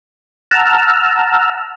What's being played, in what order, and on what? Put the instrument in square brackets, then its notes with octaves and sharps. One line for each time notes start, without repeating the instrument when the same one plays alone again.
[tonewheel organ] F#5 A5 A#5 E6 F6